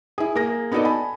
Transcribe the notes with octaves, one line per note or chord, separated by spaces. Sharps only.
E4 G#4
A#3 G#4 A#6
B3 D#4 F#4 A4 D5 D#5
G#5 A5 B5